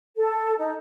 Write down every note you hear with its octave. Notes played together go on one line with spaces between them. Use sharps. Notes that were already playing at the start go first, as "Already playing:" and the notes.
A4
D#4